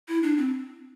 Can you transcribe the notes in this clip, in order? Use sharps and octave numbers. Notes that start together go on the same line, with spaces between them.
E4
D4
C4